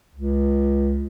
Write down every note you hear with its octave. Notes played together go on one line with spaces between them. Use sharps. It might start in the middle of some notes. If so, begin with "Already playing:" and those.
C#2